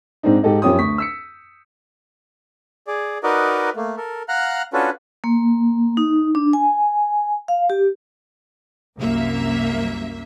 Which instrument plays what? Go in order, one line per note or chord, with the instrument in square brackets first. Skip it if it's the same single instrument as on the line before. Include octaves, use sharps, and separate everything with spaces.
[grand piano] G#2 C4 D4 D#4
G#2 G4 A4 D#5
F#2 F3 C#4 G4 D#6
D2 C#6 B6
E6 B6 C#7
[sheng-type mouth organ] G#4 D5
D#4 F#4 A#4 B4 D5 D#5
A3 A#3
A4 A#4
F5 F#5 A#5 F6 F#6
C#4 D4 F4 F#4 A4 B4
[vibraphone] A#3
D#4
D4
G#5
F5
G4
[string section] C2 F#2 A#3 E5